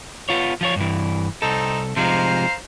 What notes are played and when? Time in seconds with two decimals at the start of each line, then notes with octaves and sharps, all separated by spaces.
0.29 B3 F4 C#5
0.61 F3 F4 C#5
0.76 G2 E3
1.42 C2 C4 D#4 A4
1.97 C3 F3 G#3 C5 F5 A#5